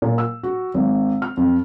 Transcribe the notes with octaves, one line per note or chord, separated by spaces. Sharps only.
A#2
E6
F#4
G#1
F6
F2